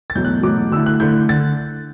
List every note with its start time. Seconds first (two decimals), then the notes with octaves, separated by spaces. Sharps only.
0.10 A6
0.15 E2 B2 F#3 A3 G6
0.25 F#6
0.43 E2 B2 F#3 A3 D6
0.71 D3 A3 E4 E6
0.86 F#6
1.00 D3 A3 E4 G6
1.29 D3 A6